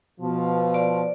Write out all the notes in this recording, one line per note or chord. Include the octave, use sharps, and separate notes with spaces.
B2 F3
D5